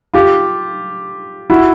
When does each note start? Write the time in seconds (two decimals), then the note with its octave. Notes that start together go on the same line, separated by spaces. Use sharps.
0.14 F4 G4
1.50 E4 F#4